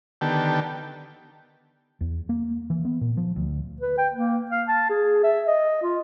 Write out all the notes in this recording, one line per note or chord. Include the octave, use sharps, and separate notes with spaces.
D3 D#3 B3 G4 G5 A5
E2
A#3
E3
B3
A#2
F3
D2
B4
G5
A#3
F5
A5
G#4
E5
D#5
F4